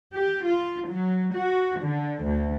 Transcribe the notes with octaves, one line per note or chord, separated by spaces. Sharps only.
G4
F4
F#3
F#4
D3
D2